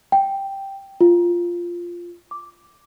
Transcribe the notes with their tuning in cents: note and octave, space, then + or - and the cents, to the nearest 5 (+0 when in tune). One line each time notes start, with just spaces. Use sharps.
G5 +0
F4 -5
D6 -5